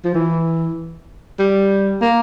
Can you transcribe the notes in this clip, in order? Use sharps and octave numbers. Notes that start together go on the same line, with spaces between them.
F3
E3
G3
A#3